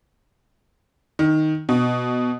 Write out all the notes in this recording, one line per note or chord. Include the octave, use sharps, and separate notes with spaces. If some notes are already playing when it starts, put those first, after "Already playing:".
D#3
B2